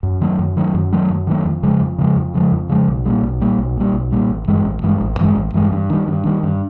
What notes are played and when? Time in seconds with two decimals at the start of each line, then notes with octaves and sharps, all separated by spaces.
0.03 F#2
0.21 D#3 F#3 A3
0.39 F#2
0.57 D#3 F#3 A3
0.74 F#2
0.92 D#3 F#3 A3
1.10 F#2
1.27 D#3 F#3 A3
1.45 F2
1.63 C#3 F3 G#3
1.81 F2
1.98 C#3 F3 G#3
2.16 F2
2.34 C#3 F3 G#3
2.52 F2
2.69 C#3 F3 G#3
2.88 B1
3.06 A#2 G3
3.23 B1
3.41 A#2 G3
3.59 B1
3.77 A#2 G3
3.94 B1
4.12 A#2 G3
4.29 A1
4.48 G2 E3 G#3
4.65 A1
4.83 G2 E3 G#3
5.01 A1
5.19 G2 E3 G#3
5.36 A1
5.54 G2 E3 G#3
5.72 G2
5.90 D#3 G3
6.08 G2
6.25 D#3 G3
6.43 G2